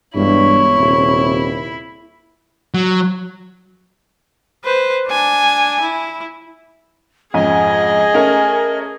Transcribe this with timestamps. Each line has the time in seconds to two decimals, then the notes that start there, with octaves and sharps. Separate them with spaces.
0.15 E1 G2 E4 C#5
0.78 D#1 C3
2.74 F#3
4.64 B4 C5
5.08 D4 G#5
5.81 E4
7.34 F2 G#2 C#4 G#4 D#5 G#5
8.14 A3 C#4 A#4